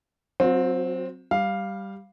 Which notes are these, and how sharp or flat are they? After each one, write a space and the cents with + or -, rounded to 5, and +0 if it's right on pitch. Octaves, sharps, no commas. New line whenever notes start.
F#3 +0 C4 +0 F#4 -45
G3 +0 F5 +0